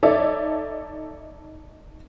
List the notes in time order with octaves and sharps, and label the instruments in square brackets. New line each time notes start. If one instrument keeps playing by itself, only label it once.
[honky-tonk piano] D#4 A4 C#5 D5 E5